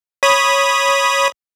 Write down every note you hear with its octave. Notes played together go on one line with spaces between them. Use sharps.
C#5 B5 D#6